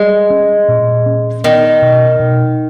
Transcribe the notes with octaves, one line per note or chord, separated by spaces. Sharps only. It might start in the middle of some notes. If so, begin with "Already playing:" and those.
Already playing: G3 G#3
C#4
A#2
C#4
D#3 B3
B2
B2